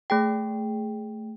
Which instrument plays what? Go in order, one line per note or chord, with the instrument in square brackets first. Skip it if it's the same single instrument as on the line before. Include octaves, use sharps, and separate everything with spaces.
[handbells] A3 G#4 G5